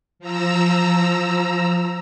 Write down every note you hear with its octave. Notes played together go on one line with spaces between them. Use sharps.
F3 A#5 E6